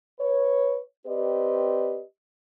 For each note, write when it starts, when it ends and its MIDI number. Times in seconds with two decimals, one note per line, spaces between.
0.20 0.80 71
0.20 0.80 73
1.07 2.02 60
1.07 2.02 67
1.07 2.02 71
1.07 2.02 74
1.07 2.02 75